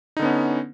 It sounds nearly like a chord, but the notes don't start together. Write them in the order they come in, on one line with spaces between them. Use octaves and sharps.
D#4 D3 B3 C#4